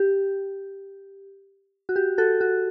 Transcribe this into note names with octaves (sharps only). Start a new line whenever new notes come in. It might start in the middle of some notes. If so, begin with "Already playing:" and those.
Already playing: G4
F#4
G4
F#4 A4
F#4